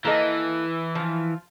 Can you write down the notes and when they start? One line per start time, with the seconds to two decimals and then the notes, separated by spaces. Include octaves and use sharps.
0.05 E3 A#3 A4 D#5
0.95 F3 F4